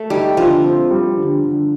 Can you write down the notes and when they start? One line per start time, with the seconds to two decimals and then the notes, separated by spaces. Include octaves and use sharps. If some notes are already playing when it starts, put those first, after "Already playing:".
Already playing: A3
0.10 G3 D#4
0.37 D3 F3
0.63 C4
0.91 G3
1.17 D3
1.43 D3